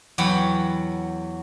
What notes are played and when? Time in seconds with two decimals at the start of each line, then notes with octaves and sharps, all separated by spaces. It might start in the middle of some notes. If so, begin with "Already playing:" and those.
0.18 E2 F#3 F#5 G5 B5